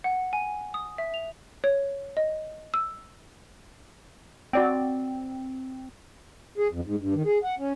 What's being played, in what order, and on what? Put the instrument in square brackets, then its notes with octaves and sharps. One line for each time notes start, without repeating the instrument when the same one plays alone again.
[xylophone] F#5
G#5
D#6
E5
F7
C#5
D#5
E6
[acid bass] C4 [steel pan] F#4 D5 G5
[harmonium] G#4
F2
G#2
G2
D#3
G#4
F#5
C#4